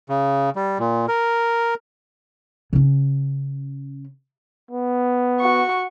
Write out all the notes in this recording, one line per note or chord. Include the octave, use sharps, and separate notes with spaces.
C#3
G3
A#2
A#4
C#3 C#4
B3
F#4 C#6